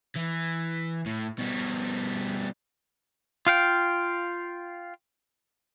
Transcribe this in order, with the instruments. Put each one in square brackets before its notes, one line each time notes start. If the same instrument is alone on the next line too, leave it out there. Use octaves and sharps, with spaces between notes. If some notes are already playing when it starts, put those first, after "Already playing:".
[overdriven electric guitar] E3
A2
B2 G3
[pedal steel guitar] F4 F5 G5